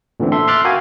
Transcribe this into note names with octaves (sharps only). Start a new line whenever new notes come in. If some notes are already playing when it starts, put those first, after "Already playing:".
A#2 D3 E3 A3 C4
A4 E5 C6
E5 C6 D6 F6 F#6 A6
F#4 A#4 F5 G5 G#5